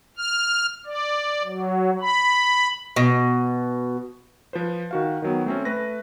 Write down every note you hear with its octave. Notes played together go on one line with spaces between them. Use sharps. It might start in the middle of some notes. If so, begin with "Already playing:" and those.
F6
D5
F#3
B5
B2
F3 B4 C5
D#3 F#4 F5
D#3 F#3 B3
A3 C4 C#4
A3 B4 A#6